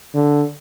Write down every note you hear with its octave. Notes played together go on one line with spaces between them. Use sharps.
D3